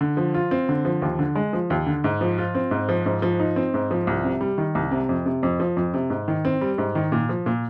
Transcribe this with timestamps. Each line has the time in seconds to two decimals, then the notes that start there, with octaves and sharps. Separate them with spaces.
0.01 D3
0.17 F3
0.34 F4
0.51 C4
0.69 D3
0.85 F3
1.02 D#2
1.19 D3
1.35 G#3
1.53 F3
1.70 D#2
1.86 D3
2.04 G#2
2.21 F3
2.38 F4
2.55 C4
2.71 G#2
2.89 F3
3.06 G#2
3.22 F3
3.40 D#4
3.56 C4
3.74 G#2
3.91 F3
4.07 C2
4.24 C3
4.41 G3
4.58 D#3
4.75 C2
4.91 C3
5.09 F2
5.26 C3
5.43 F2
5.60 F3
5.77 F2
5.94 C3
6.10 G#2
6.28 D#3
6.45 C4
6.61 G3
6.78 G#2
6.95 D#3
7.12 A#2
7.29 F3
7.46 A#2